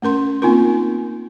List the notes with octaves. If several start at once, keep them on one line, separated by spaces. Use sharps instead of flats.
A3 C#4 A#4 C6
A#3 C4 D#4 F4 A#4